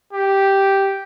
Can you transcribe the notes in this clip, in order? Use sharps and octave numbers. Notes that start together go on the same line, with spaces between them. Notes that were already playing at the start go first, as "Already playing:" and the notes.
G4